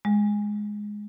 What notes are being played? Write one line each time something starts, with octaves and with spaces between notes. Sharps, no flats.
G#3